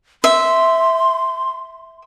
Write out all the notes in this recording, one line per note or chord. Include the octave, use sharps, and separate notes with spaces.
E5 C6